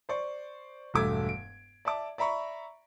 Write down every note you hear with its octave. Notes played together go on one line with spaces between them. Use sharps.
C5 D5 C#6
E1 G2 A3 D6 E6 G#6
D7
D5 E5 A5 D6
D5 E5 A#5 B5 C#6